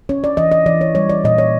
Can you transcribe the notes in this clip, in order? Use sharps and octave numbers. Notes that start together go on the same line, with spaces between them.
C#4 C#5
D5
E3 D#5
D#5
E3 D5
C#5
G3 C#5
D5
A#2 D#5
C#5